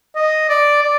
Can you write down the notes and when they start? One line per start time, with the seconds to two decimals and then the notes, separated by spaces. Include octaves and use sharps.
0.15 D#5
0.49 D5
0.83 D5